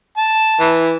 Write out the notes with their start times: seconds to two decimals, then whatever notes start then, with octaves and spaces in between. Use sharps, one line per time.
0.17 A5
0.60 E3